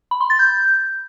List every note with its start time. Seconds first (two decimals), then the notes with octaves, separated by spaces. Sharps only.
0.11 B5
0.21 C6
0.30 A6
0.39 G6